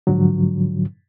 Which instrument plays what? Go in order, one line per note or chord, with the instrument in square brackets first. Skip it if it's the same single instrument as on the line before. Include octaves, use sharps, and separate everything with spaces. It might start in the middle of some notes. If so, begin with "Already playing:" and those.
[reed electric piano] G#2 D3 F3 F#3